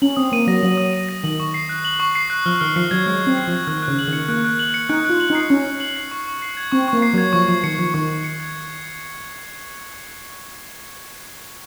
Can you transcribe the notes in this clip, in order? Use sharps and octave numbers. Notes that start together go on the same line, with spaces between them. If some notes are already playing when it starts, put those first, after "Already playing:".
C#4 F#7
C4 D#6
A#3 D#7
F#3 A#6
F#3 F#7
D#6
D#7
A#6
D#3 F#7
C#6
C7
F#6
F#7
C#6
C7
F#6
F3 F6
D#3 F6
F3 C7
F#3 G#6
G#3 F6
C4 F6
C7
F3 G#6
D#3 F#6
F#6
C#3
F#7
D#3
C#7
A#3 F#6
F#6
F#7
C#7
D#4 F#6
F4 F#6
F#7
D#4
C7
C#4 F#6
F#6
F#7
C7
C#6
C#6
C7
G#6
C4 C#6
A#3 C#6
C7
F#3 G#6
F3 C#6
F3 C#6
D#3 C#7
F3 G#6
D#3 C#6
C#6
C#7
G#6